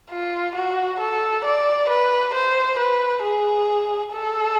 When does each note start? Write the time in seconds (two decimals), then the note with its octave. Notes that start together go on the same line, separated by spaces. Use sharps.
0.11 F4
0.56 F#4
1.00 A4
1.45 D5
1.90 B4
2.35 C5
2.80 B4
3.24 G#4
4.13 A4